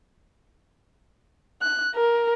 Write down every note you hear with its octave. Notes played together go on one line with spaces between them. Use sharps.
F#6
A#4